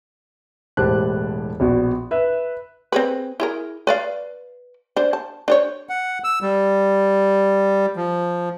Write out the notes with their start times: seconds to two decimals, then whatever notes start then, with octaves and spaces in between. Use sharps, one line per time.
0.77 E1 A2 G4 C5 A5 F#6
1.60 A#1 B2 F#4
2.11 B4 E5 F#6
2.92 C4 G#4 B4
3.40 E4 G#4 A#4
3.87 B4 D5 F5
4.96 D4 C5
5.13 A5
5.48 D4 C5 C#5
5.89 F#5
6.24 E6
6.42 G3
7.96 F3